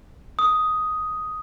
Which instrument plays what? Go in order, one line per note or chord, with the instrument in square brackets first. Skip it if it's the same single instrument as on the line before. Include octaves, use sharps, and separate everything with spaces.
[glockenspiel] D#6